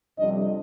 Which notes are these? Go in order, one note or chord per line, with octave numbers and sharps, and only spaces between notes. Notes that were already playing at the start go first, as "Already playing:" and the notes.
F2 C3 G3 D4 D#5